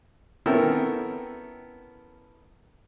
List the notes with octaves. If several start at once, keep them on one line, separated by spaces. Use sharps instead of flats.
B3 C#4 E4 A4 A#4 G5